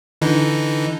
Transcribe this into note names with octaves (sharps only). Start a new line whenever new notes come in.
D3 E3 D#4